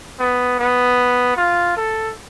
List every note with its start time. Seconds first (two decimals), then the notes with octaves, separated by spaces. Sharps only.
0.20 B3
0.59 B3
1.37 F4
1.77 A4